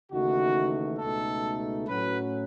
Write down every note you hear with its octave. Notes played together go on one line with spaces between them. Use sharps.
D#2 C#3 E3 A3 D#4 F#4
C#2 B2 A3 D#4 A4
A2 F#3 C#4 B4